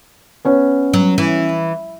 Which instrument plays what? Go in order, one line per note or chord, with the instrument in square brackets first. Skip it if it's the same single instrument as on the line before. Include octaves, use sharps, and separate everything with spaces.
[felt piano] B3 C#4 C#5
[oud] F#3
E3